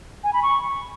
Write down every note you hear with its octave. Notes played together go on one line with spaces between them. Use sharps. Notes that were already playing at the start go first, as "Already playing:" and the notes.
G#5
B5
C#6